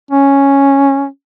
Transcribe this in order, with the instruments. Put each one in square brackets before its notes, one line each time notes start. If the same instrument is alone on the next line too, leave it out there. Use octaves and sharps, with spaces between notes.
[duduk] C#4